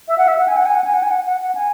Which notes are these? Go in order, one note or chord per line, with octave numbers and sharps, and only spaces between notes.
E5
F#5
E5
F#5
G#5
F#5
G#5
F#5
G#5
F#5
G#5
F#5
F#5
F#5
G#5